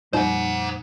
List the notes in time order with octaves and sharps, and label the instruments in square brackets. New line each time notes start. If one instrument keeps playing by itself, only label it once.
[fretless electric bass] F2 A#2 G3 [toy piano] D#4 C#5 [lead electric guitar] C5 F#5